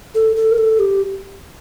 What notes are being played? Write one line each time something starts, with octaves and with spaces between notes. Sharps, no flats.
A4
A4
A#4
A4
G4